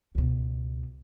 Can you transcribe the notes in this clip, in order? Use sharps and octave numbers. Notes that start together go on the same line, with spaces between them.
C#2 B2